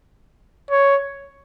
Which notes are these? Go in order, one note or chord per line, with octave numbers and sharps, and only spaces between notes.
C#5